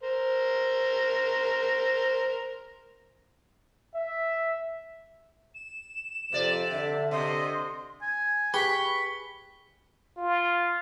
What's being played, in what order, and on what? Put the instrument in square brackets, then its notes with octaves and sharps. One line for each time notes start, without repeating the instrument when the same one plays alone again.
[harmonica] A#4 C5
[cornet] E5
[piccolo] E7
[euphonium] F2 [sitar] C3 D5
[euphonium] D3 [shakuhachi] E5
[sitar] C3 [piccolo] D#5 [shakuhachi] C6
[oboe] G#5
[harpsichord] G4 [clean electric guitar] G#4 B4 [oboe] C#6 [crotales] B6 G7
[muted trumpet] F4